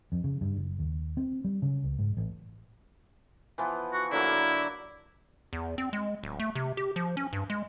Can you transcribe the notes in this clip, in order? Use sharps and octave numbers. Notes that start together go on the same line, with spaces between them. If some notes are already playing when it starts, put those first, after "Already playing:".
F2
C#3
G2
F#1
D#2
C4
G3
C#3
C#2
G#2
A1
E3 F3 B3
F#4
D3 F#3 A#3 E4
E2
C4
G#3
D1
A3
C3
G4
F3
C#4
G2
G#3